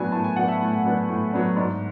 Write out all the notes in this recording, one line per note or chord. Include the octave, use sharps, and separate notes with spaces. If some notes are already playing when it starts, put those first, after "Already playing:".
Already playing: A2 F#3 B3 D4 G#5
A2 A5
G#5
F#3 B3 D4 F#5
E5
A2
F#3 B3 D4
A2
F#3 B3 D4
G#2 D5